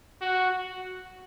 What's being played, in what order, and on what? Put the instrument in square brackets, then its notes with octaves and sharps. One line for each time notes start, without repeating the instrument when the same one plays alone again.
[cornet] F#4